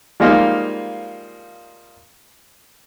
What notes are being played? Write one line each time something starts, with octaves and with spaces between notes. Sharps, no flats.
F3 G3 G#3 A#3 D#4 F4